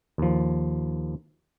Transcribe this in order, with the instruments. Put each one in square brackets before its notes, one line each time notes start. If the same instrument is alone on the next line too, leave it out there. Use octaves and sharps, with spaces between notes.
[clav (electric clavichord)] D#2 F3